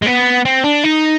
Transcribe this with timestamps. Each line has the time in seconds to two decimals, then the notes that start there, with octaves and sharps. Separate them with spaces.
0.03 G#3
0.07 B3
0.45 C4
0.64 D4
0.84 D#4